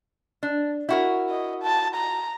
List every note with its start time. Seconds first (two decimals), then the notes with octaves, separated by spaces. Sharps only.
0.43 D4
0.89 E4 F#4 A#4
1.30 D#5
1.63 A5
1.95 A#5